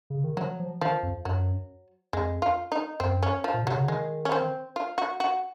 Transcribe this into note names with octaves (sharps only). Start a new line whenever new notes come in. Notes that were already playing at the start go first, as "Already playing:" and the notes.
C#3
D#3
F3 F#3
F3
D#3 F3
F2
F#2 F#3
F2 G#3
F4
D#4
F#2 C4
C#4
F3
A#2
C3 F#3
C#3
D#3 G#3
C#4
C4
F4
F#4
F#4